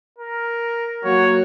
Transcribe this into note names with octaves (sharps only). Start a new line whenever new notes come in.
A#4
F#3 A#3 F#4 C#5